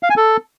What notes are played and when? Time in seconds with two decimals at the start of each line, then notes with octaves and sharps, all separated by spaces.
0.03 F5
0.10 G#5
0.17 A4